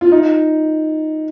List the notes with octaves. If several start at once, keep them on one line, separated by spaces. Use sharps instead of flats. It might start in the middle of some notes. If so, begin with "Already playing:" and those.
F4
D#4